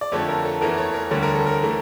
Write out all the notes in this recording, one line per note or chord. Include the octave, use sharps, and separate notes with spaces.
D5
F2 D3 A3 C#5
A#4
A4
E2 E3 A3 A#4
C#5
A#4
D2 D3 G3 C#5
A#4
A4
A#4
E3 A3